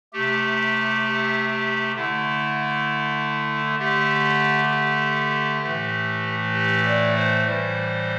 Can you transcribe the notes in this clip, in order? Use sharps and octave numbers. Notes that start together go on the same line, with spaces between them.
C3 A3 G4
G4
G4
D3 A3 E4
D3 A3 G4
G4
A2 E3 A3
G4
D5
C5
A2 E3 G3 C5